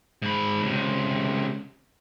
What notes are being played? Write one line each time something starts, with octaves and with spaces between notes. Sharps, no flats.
G#2 B5
C#2 C3